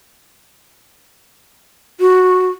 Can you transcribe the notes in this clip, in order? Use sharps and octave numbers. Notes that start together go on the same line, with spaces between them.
F#4